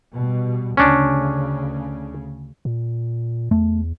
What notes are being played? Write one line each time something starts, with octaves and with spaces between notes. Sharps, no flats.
B2 G3
D2 C#3 C#4 D4
A#2
E2 A3